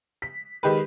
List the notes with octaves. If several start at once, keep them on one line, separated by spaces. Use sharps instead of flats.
B6
D#3 G#3 G4 B4